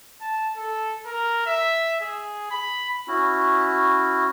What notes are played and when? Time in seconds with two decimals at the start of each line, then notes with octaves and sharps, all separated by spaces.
0.21 A5
0.57 A4
1.06 A#4
1.46 E5
2.01 G#4
2.51 B5
3.08 C#4 E4 F#4